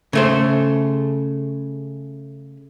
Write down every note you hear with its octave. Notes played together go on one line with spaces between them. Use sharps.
C#3 A3 C5